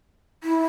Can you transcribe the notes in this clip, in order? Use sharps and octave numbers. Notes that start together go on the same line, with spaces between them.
E4